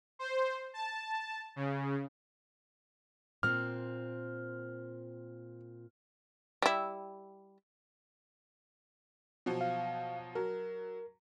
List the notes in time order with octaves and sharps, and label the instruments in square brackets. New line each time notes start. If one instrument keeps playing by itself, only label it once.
[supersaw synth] C5
A5
C#3
[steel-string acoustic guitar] A#2 C4 [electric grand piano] F6
[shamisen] G3 E4
[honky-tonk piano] B2 F3 F#3
[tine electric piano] F5
[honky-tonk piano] F#3 [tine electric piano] A#4